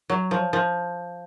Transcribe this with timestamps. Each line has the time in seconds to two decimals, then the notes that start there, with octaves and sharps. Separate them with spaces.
0.10 F#3
0.31 F3
0.53 F3